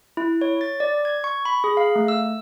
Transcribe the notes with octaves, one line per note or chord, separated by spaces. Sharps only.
E4
C#5
A6
D5
G#6
C#6
B5
G#4
F5
A3
E6